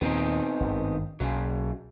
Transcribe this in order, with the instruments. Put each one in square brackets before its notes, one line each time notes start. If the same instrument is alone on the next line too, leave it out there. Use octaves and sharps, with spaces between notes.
[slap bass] D#2 A#2 [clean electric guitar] B3 C4 D#4
[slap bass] G#1 G2 D#3
[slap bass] B1 [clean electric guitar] F#2 C#3 F#3